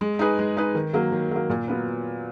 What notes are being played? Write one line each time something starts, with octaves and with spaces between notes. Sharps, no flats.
G#3
D#4 G#4 B4
G#3
D#4 G#4 B4
D#3
F#3 A#3
D#3
F#3 A#3
A#2
F#3 B3 F4 B4